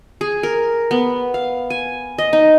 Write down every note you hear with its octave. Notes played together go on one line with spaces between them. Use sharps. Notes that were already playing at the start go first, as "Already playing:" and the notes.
G#4
A#4
B3
F5
G#5
D#5
D#4